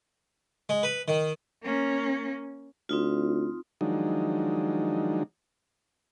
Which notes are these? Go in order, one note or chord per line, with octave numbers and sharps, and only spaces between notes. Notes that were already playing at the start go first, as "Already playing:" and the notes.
G#3
B4
D#3
A#3 C#4
D2 C4 D#4 F4
D#3 F3 F#3 G#3 D4 D#4